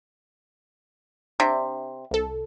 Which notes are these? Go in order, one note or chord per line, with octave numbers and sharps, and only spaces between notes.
C3 D4
C2 A4